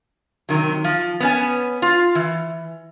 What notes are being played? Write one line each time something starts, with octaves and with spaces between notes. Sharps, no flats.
C3 D#3 F#3
F3
B3 C#4 G#5
F4
E3